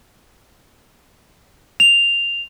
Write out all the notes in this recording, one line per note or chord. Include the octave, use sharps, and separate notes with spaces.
F7